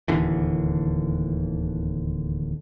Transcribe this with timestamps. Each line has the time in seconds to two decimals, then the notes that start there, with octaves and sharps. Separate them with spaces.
0.08 D1 D#2 D3 E3